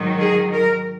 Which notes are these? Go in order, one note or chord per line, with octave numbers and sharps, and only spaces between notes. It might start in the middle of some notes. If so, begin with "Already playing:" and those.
Already playing: G#2 D#3 F#3
G#4
A#4